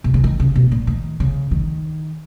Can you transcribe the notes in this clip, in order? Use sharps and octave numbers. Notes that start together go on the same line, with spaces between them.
B2
C#3
D#3
C#3
B2
A#2
D#3
C#3
D#3